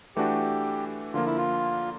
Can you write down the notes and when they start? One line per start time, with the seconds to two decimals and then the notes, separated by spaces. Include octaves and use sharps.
0.16 E3 A3 D4 F#4 G4
1.14 D3 F3 A#3 F4
1.26 E4
1.37 F4